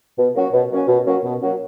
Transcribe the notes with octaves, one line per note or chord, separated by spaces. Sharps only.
B2
F#3 A#3 C#4 F#4
B2
F#3 A#3 C#4 F#4
B2
F#3 A#3 C#4 F#4
B2
F#3 A#3 C#4 F#4